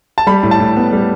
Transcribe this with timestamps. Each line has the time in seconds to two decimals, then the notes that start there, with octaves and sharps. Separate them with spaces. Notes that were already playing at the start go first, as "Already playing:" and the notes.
0.18 A5
0.27 G3 B5
0.43 A2
0.51 A5
0.60 A2
0.76 B3
0.92 G3